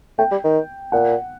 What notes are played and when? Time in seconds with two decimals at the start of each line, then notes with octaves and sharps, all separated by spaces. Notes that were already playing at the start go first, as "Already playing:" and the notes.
0.19 A3 G5
0.31 G3
0.44 D#3
0.92 A#2 F#5